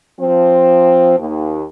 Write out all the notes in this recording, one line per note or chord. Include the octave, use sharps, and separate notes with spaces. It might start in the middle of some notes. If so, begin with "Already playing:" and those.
F3 C4
D#2